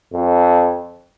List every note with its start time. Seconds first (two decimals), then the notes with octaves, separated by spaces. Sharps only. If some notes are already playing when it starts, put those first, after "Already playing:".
0.13 F2